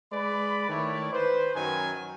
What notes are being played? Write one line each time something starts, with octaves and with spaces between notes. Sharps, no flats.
G#3 B4 D5 B5
D#3 A3 E4 C#5 D5
B4 C5
F#2 D#3 F#3 G#5